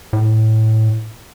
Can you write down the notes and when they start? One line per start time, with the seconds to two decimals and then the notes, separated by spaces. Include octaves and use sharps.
0.13 A2